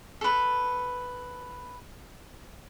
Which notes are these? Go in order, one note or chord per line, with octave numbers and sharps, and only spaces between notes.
A4 B4